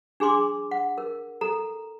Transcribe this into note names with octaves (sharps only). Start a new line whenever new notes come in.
D4 G#4 G#5 C6 D6
F#5
A#4
A4 A#5